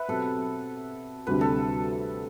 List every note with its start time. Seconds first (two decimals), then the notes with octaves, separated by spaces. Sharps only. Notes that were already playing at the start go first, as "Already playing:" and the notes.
Already playing: B4 E5 F#5
0.08 B2 F#3 C4 G4 A4
1.27 D2 C3 G3 D4 B4
1.41 A4